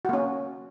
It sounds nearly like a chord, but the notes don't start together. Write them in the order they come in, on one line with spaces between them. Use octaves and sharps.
F#4 A#3 C#4